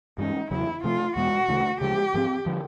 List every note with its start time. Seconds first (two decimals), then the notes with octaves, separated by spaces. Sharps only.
0.18 G2 E3 G#3 C#4 D#4
0.51 E2 C#3 F#3 E4
0.84 C3 F3 A3 F4
1.16 E2 B2 G#3 B3 F#4
1.48 D2 C#3 E3 A3
1.81 D2 C#3 F3 G#3 G4
2.14 G#2 F3 A3 C4
2.46 D3 F3